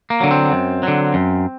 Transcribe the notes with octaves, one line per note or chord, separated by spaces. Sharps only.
A#3
D3 F#3
C4
F#2
D3 F#3
F#2